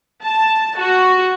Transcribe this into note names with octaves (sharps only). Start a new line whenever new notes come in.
A5
F#4